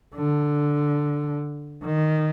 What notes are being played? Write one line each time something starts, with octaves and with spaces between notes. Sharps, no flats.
D3
D#3